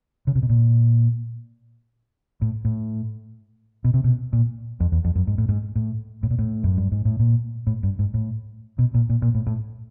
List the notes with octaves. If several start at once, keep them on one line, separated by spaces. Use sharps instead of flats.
C#3
C3
B2
A#2
A2
A2
B2
C3
B2
A#2
F2
E2
F2
F#2
G#2
A2
G#2
A2
A2
A#2
A2
F#2
G2
G#2
A2
A#2
A2
G2
G#2
A2
B2
A#2
A#2
A#2
A2
A2